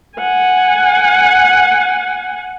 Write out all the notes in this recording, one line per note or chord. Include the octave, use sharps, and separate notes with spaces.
F#5 G#5